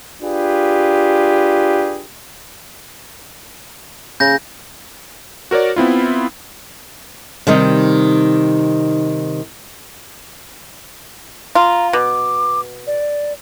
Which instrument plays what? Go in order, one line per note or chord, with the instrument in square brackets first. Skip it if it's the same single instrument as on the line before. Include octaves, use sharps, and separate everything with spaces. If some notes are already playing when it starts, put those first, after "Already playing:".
[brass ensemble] D4 F4 G4 G#4 B4
[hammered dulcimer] C#3 [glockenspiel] G6 A#6
[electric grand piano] F#4 A#4 C#5 D5
B3 C4 E4 F4
[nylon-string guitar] C3 D#3 G3 D#4
[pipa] F4 [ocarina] A#5
[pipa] B2 [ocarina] D6
[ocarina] D5